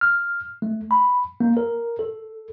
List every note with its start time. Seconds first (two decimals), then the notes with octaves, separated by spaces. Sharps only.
0.01 F6
0.62 A3
0.91 B5
1.40 A#3
1.57 A#4
1.99 A4